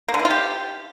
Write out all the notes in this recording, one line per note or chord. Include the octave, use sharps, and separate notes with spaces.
A#3
D3
E3
F4
G4